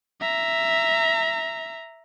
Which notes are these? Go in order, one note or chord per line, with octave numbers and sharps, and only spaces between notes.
E5 A#5